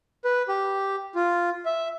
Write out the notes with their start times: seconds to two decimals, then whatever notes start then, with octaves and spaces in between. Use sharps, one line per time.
0.25 B4
0.49 G4
1.15 F4
1.65 E5